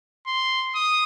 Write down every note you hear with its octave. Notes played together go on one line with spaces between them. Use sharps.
C6
D#6